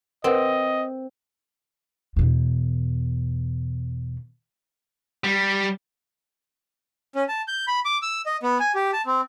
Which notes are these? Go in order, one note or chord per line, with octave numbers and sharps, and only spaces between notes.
C4 A#4 B4 D#5 F#5
E2 B2
G3
C#4
A5
G6
B5
D6
E6
D#5
B3
G#5
G4
A5
C4